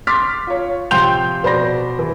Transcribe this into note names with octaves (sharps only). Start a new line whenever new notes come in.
C6 D6 F6 A6 B6
F4 C#5
C3 F3 G5 C6 G6 F7
B2 C5 D5 B5 A#6
E3